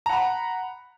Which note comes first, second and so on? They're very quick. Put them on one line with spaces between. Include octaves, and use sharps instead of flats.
A#5 F#5 B5